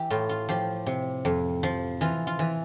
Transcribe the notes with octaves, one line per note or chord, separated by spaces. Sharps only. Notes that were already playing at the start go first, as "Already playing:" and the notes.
Already playing: E3 G4
A2 F4
F4
F3 G4
C3
F2
F3
E3 F4
F4
E3